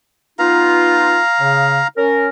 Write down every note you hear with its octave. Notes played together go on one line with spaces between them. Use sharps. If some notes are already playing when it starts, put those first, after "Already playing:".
B3 D#4 F4 F5 A#5
C#3
C#4 A#4